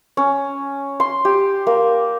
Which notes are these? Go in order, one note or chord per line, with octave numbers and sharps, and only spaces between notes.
C#4
C6
G4
A#3